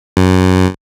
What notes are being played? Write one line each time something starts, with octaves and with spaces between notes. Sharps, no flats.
F#2